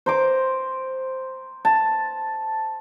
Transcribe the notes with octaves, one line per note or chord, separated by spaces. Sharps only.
C5 A#5 D6
A5